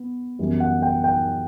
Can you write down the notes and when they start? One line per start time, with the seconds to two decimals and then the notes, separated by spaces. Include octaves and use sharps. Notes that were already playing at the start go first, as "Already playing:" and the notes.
Already playing: B3
0.39 F#2 E3 G3 B3
0.60 F#5
0.82 G5
1.04 G5